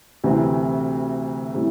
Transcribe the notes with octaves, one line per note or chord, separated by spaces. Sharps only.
D2 C3 E3 C4
A2 G3 C4 E4